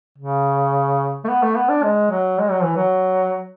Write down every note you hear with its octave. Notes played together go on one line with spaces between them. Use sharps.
C#3
A3
B3
A3
B3
D4
G#3
F#3
G#3
F#3
E3
F#3